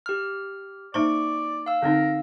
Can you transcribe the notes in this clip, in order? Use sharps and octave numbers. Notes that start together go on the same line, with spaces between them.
G4 F6
A#3 D#4 C5 D5 C#6
F5 E6
D3 C4 D#4 A#4